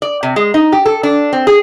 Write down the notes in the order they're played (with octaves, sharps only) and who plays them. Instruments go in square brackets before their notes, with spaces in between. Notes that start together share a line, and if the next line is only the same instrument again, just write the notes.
[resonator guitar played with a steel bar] D5
C3
G#3
D#4
G4
A4
D4
C4
G#4